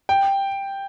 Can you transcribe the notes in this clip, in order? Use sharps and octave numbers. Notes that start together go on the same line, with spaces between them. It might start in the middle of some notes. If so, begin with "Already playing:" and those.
G5